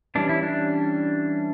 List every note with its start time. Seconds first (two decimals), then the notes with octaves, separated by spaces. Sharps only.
0.15 E3 G3 C#4 D4
0.29 E4
0.43 D4